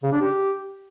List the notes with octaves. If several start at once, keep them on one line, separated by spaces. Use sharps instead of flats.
C#3
D4
G4